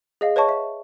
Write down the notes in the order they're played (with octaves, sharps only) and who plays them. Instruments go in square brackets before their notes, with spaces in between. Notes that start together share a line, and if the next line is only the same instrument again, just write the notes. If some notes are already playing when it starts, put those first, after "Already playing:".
[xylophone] G#4 D#5 F5
B4 C#5 D#5 A5 C#6
E5